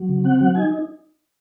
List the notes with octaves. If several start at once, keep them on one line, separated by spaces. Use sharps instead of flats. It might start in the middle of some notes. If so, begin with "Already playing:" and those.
Already playing: F#3
C#3
C4 F#5
F#3 F#5
D#4 G#5